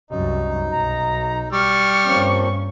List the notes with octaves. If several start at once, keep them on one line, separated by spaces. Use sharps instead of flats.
C2 F#2 D#4
B1 A#5
G3 C#6 F6
G2 F3 A#3 C4 C#4